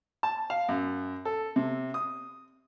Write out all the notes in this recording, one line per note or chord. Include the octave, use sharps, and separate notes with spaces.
A5
F5
F#2
A4
C3
D#6